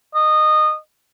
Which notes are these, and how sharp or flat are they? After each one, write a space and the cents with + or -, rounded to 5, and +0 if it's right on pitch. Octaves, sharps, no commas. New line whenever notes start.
D#5 -20